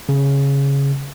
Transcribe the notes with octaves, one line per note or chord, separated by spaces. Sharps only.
C#3